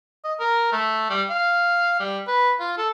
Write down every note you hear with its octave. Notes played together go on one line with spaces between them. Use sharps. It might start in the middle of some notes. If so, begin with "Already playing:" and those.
D#5
A#4
A3
G3
F5
G3
B4
F4
A4